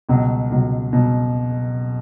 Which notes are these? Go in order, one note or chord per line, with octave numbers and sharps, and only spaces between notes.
C#2 B2 F#3
C#2 B2 F#3
B2 F#3